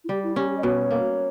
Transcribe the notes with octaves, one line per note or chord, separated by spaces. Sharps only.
E4
G3 G4
E4
C#4 G4
G4
D#5
B2 C#5
A#3